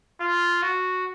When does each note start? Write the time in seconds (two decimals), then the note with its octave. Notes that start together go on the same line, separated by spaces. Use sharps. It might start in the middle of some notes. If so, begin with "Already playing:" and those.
0.21 F4
0.62 F#4